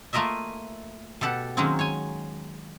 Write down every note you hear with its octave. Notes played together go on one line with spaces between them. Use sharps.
A3 A#3 F4 A#4 D#5 E5
B2 G4 A4 F#5
D#3 F#3 G#3 A#3 C4 C#4
C#5 G#5